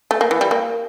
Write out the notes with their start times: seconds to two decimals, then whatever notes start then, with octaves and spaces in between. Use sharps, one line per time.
0.11 A3
0.21 A#3
0.31 E3
0.41 G3
0.51 A#3